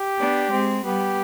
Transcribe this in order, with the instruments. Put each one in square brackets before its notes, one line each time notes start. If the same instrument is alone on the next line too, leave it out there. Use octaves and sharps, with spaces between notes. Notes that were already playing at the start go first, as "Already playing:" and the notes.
Already playing: [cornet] G4
[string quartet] B3 D4
G#3 C4
[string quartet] G3 B3 [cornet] G4